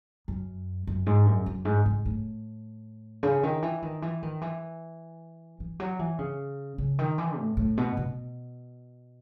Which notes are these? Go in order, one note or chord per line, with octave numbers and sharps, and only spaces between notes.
F#2
F#2
G#2
F#2
F#2
G#2
G#2
A2
C#3
D#3
E3
D#3
E3
D#3
E3
E3
F#3
E3
C#3
C#3
D#3
E3
A2
A2
B2
B2